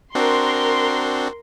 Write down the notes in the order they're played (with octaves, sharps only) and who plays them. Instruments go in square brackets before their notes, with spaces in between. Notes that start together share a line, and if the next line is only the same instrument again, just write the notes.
[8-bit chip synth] C4 D4 F#4 [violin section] A#4 C6